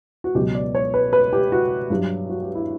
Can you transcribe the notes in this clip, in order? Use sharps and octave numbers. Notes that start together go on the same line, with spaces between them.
F#4
C#2 B2 F#3 G4
D5
C#5
B4
B4
G4
F#4
G2 F#3
F#4
G4
E4